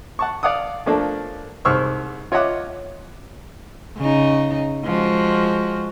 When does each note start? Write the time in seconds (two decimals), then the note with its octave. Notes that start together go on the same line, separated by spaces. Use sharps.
0.19 F#5 A5 C#6
0.43 D5 F5 F#5 D6 D#6
0.86 F3 A3 A#3 D4
1.65 C2 G#2 C5 C#6 E6 F6
2.32 F4 C#5 D#5 E5 F#5 D6
3.97 C#3 D#4
4.85 F3 G#3 F#4